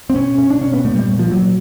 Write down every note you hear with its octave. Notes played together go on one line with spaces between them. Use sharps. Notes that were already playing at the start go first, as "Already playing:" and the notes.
C4
B2 C#4
B2 C#4
D4
B2 C#4
B3
A#2 A3
G3
A#2
F3
A#2 F#3